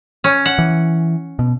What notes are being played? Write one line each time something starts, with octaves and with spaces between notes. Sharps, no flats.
C#4
F#5
E3
B2